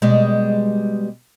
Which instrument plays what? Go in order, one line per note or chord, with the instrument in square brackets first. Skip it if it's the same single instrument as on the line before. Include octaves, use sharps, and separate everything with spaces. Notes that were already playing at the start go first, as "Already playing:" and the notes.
[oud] B2 G3 G#3